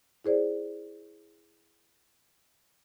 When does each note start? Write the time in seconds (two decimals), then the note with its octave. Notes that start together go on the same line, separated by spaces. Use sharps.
0.25 E4 G#4 C5 D5